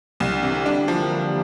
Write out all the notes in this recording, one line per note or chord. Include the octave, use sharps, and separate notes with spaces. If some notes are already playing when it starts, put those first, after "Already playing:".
C2 C3
D3
C3 E3
G3 D4
F3 A#3